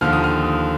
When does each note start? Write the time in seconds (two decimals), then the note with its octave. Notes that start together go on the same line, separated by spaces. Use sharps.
0.01 D#2 D3 F3 F6
0.13 D#6
0.24 F6